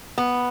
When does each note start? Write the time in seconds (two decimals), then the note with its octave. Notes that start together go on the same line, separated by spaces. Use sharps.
0.18 B3